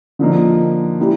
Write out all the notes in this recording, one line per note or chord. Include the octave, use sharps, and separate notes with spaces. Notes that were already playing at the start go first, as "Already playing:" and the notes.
D3 F3 A#3 D#4
E3 G3 A#3